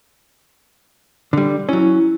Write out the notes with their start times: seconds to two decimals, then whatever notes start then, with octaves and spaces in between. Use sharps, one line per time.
1.33 D3 G3
1.69 F#3 C#4 E4